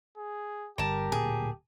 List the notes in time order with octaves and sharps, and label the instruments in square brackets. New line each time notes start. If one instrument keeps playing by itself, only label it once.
[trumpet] G#4
[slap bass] G1 D3 G3 [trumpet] G4 [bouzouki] A#4 A5
[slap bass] D1 A#2 [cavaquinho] G#4